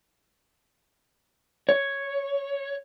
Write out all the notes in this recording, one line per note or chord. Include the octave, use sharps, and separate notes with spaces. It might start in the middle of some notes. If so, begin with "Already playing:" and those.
C#5